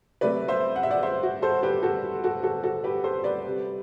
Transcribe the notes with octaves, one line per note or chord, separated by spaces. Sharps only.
C3 F#3 A3 B4 D5
C5 E5
F#5
E5
D5 F#5
C5 E5
F#4
A4 C5
G4 B4
F#4 A4
F#4 A4
F#4 A4
F#4 A4
G4 B4
A4 C5
B4 D5
C3 G3